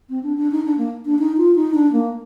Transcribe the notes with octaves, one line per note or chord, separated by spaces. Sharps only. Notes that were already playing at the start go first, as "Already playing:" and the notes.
C4
D4
D4
D#4
D4
A#3
D4
D#4
F4
D#4
D4
A#3